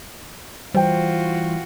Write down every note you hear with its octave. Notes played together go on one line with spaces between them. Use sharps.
E3 G3 F4 F#4 C5 G5